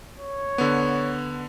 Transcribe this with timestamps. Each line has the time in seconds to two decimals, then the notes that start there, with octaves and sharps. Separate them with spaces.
0.19 C#5
0.58 D3 B3